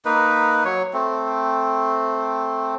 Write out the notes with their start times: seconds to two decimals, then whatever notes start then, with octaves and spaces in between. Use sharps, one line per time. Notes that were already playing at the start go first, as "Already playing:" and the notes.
0.05 A#3 D#4 B4
0.65 F#3 C#5
0.94 A3 C4